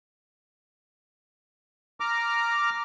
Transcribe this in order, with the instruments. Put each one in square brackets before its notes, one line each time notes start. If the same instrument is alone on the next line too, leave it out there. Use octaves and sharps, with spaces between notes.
[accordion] A#5 D6 F6